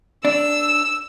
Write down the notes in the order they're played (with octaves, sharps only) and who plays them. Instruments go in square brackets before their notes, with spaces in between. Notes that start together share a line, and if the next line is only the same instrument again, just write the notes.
[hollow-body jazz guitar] D4 [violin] E6